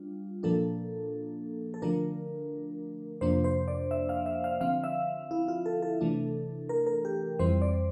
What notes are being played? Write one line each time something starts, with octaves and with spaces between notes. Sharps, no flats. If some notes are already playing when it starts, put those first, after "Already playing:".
Already playing: G3 D4 F4
A#2 F3 A#3 D4 A4
A4
D3 F3 A3 D4 A#4
F2 C3 F3 A#3 D4 C5
C5
D5
E5
F5
E5
F5
D3 F3 C4 F5
E5
E4
F4
A4
A4
C3 E3 A3 D4
A#4
A#4
G4
F2 E3 G3 C4 C5
D5